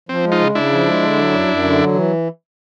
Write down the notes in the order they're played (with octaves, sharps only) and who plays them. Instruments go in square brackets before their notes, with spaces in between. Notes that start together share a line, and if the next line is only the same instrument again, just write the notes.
[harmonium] F3 [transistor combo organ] C4
[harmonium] G#3
[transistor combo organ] D#4 F4
[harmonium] C#3
[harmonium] C#3 [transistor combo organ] D4 E4
[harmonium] F3
G#3
D3
F#3
F#2
F#2
D3
F#3
E3